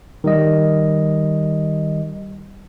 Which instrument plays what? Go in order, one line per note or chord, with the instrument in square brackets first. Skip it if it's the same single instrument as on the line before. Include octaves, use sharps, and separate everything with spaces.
[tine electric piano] D#3 G3 D#5